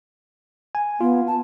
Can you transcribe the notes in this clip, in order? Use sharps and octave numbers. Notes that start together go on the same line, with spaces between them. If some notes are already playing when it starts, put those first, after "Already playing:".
G#5
B3 F4
A5